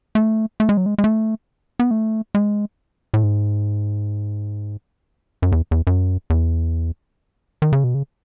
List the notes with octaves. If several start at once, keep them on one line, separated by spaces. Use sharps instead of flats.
A3
A3
G#3
F#3
G#3
G#3
A3
B3
A3
G#3
A2
G#2
F#2
E2
E2
F#2
E2
D#3
C#3
B2
C#3